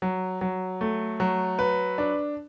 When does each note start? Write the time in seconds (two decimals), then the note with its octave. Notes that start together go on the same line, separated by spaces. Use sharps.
0.02 F#3
0.41 F#3
0.81 A3
1.20 F#3
1.59 B4
1.98 D4